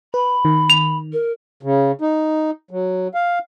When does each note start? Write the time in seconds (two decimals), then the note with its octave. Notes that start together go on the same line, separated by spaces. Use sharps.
0.14 B4 B5
0.45 D#3
0.70 F7
1.13 A#4
1.63 C#3
2.01 D#4
2.71 F#3
3.14 F5